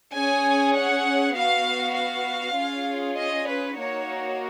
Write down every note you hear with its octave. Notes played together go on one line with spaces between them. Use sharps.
C#4 G#4 G#5
F#5
B3 F#4 F5
F5
C#4 F4 G#4
D#5
B4
A#3 D#4 F#4 C#5